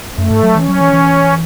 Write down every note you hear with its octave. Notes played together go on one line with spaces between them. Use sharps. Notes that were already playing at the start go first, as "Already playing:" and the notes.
F#2 A3
G#2
F#3
E3 C#4
F#3
E3
E3